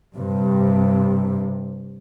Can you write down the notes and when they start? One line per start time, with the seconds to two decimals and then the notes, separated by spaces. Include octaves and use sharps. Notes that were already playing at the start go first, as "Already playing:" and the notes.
0.15 G2 C3